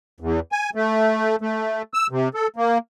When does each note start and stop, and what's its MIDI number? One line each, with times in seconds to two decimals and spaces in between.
0.20 0.40 40
0.52 0.70 80
0.75 1.36 57
1.41 1.82 57
1.94 2.07 88
2.11 2.29 48
2.34 2.48 69
2.56 2.78 58